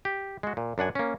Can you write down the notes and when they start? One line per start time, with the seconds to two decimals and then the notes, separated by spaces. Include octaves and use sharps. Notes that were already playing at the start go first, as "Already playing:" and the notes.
0.05 G4
0.43 G#3 F#4
0.57 A#2
0.78 F#2 D4 F#5 G#5
0.95 A#3 C#4